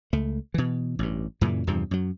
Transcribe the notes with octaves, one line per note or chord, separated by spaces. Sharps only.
C#2 A3
B2 E3
A1 G2
F#2 A#2 C#3 E3
E2 G2 C3 F3
F#2 F#3